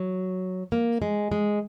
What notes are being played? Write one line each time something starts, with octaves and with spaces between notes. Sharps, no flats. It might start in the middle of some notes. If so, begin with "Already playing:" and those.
Already playing: F#3
A#3
G#3
G#3